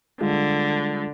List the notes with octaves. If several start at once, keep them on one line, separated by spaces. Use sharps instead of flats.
D3 G3 G#3 F4